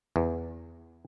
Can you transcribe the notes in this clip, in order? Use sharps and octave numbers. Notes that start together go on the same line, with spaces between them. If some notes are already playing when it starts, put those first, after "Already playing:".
E2